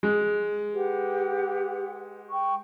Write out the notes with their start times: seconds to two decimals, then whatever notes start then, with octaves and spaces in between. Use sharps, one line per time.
0.03 G#3
0.74 G4 B4 F#5
2.31 G5 C#6